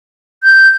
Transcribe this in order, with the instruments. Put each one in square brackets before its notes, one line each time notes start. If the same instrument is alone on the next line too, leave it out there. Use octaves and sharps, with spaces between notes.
[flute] G6